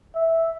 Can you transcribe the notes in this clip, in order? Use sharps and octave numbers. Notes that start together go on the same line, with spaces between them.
E5